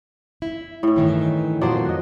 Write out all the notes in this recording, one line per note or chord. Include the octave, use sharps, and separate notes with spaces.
E4
A2 C#4
G2 D#3 E3
F2 A#2 F3 F#3 C5 D5
F#4 D#5